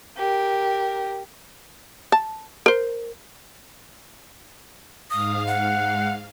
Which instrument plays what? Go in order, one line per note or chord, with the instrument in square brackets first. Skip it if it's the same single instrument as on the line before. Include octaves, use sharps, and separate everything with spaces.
[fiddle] G4 A#4
[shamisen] A5
A#4 C5
[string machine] G#2 F5 [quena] D#6
[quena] F#5